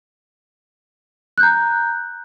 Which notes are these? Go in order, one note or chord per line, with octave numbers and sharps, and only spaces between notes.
A#5 F#6 G6